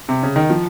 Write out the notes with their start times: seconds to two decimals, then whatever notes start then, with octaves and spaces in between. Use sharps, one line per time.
0.09 C3
0.23 C#3
0.36 D#3
0.50 F3